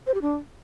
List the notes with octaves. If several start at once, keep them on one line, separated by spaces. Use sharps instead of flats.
C5
G4
D4